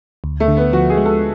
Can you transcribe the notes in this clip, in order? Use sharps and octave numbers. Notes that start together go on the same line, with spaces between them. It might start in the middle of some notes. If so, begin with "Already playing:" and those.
D2
A3
D3
B3
F3 F#4
G#4
G#3
A4